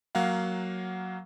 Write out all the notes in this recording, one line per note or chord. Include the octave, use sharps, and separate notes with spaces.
F#3 A#3 F5 F#5